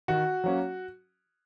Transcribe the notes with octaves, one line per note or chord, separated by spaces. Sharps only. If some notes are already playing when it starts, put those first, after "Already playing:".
D#3 F#4
F#3 A#3 C#4